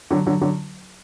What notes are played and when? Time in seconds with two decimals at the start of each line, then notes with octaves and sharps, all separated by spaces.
0.11 D3 F#3
0.27 D3 F#3
0.42 D3 F#3